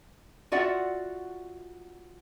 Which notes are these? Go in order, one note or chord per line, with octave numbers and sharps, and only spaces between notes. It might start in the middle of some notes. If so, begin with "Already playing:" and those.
F4 F#4 D5 E5 F#5